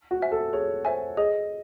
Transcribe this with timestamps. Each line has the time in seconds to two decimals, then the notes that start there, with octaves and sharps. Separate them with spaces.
0.11 F#4
0.22 C5 E5 G#5
0.31 A4
0.53 G#4 C#5
0.85 C5 E5 G#5
1.17 G#4 D#5